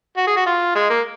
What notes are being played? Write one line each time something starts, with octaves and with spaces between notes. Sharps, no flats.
F#4
G#4
F#4
F4
G#3
A#3